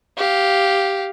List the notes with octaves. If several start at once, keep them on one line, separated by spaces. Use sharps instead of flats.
G4 F5